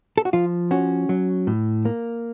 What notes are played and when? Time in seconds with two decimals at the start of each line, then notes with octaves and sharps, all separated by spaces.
0.18 A4
0.25 F#4
0.33 F3 F4
0.71 C#4 F#4
1.09 F#3
1.47 A2
1.85 A#3